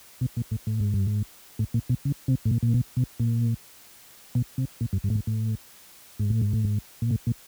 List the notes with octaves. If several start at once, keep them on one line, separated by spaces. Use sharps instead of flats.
B2
A#2
A2
A2
G#2
G2
G#2
A2
A#2
B2
C#3
C3
A2
A#2
A#2
B2
B2
A#2
B2
C3
A#2
G2
G2
A2
G#2
A2
G#2
A2
G#2
A2
G#2
A#2
A2
A#2